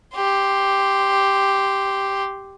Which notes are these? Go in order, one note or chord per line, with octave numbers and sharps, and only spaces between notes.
G4 C6